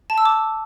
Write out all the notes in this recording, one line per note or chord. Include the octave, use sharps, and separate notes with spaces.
A5
E6
D6